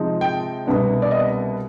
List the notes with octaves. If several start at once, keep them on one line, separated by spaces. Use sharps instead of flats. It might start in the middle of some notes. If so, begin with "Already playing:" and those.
Already playing: C3 F3 G#3 C4 D#4
G5
C2 B2 B3 D4
D5
D#5